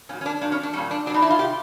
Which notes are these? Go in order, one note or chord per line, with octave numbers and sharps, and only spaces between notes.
A#2 F#3 C#4
C#4
D4
A#2 F#3 D4
C#4
D4
A#2 G3 C#4
D4
F#3 D4
B2 D#4
E4
F4
C3 G4